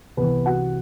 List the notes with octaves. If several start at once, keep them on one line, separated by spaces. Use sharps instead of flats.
C2 C3 E3 B3 B4
F#4 F#5